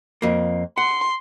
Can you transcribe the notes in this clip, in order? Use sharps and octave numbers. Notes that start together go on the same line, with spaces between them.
F2 A#3
F#5 C6